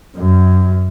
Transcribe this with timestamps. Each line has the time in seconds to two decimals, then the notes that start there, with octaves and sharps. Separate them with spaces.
0.17 F#2